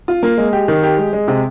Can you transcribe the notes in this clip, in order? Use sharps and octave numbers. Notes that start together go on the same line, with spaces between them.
F4
A#3
G#3
G4
D#3
G4
G#3
G#3
C3